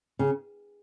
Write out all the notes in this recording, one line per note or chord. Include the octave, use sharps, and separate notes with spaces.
C#3